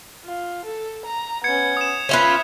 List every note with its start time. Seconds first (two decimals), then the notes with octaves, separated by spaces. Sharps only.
0.25 F4
0.65 A4
1.05 A#5
1.44 B3 C#4 G#6 C#7
1.77 D#6 E7
2.09 C#4 F4 B4 E5